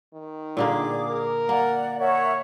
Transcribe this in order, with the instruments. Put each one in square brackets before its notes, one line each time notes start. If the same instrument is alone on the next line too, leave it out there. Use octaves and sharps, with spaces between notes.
[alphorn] D#3
[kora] A#2 D3 A#3 [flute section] G#4 D6
[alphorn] A#4
[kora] A#3 [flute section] D5 F#5
[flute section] A#4 E5 F#5 [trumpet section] C#5